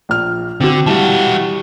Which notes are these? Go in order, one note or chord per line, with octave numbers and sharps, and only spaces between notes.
A#1 F6
D3 C4 F#4
E3 G3 E4 F#4 A5